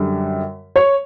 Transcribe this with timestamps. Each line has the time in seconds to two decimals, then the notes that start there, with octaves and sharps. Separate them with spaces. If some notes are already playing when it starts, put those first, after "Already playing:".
Already playing: F#2 D3 G3
0.76 C#5